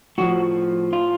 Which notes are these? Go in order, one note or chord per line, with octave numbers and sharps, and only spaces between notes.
A2 F3 F#4
F4